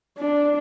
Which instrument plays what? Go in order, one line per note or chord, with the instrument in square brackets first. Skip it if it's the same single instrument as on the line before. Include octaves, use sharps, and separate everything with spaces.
[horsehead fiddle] D4